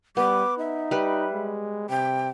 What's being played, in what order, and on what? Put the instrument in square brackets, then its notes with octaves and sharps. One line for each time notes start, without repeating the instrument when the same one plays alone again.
[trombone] G3 [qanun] B3 [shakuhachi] D6
[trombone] D#4 [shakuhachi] E5
[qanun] G3 B4
[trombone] G#3
[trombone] C3 [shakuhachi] G5